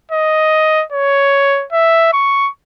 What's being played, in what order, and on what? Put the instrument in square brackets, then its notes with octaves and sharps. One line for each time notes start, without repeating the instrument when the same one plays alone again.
[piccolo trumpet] D#5
C#5
E5
C#6